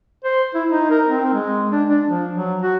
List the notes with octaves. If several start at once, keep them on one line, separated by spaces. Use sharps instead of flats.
C5
E4
D#4
A#4
C4
G#3
D4
D4
F3
F#3
F#4